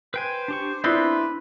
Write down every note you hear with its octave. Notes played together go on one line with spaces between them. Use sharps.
B4 C5 G5 G#5
D4 G4 C#6
B3 C4 D4 E4 B4 D5 C6